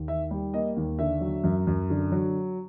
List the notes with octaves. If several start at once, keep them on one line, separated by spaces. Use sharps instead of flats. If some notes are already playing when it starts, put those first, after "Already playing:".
Already playing: D#2
D#3 E5
G3
A#3 D#5
D#2
D3 E5
F#3
F#2
F#2
D3
F#3